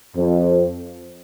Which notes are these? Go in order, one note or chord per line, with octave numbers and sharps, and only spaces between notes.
F2